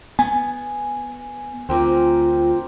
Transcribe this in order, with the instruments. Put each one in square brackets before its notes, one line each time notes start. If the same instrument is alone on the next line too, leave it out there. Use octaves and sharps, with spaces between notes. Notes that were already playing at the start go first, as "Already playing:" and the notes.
[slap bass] B3 [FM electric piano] G#5
[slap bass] D2 [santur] C4 A#4 D6 [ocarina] F4